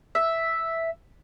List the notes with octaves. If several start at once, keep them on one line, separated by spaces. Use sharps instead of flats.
E5